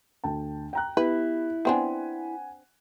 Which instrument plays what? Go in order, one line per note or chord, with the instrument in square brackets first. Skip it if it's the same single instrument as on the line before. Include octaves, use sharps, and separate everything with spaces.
[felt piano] D2 G5 A5
G5 A#5 F#6
[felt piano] B3 G4 [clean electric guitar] E4 [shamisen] B4
[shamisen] B3 C4 D4 [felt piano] F#5 G#5